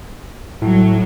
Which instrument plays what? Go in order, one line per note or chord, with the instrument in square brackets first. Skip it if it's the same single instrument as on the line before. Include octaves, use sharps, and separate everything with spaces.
[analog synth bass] A2 [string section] F#3